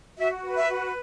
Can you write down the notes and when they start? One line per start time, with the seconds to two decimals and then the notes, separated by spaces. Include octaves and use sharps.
0.17 F#4 E5
0.43 B4
0.55 E5
0.69 F#4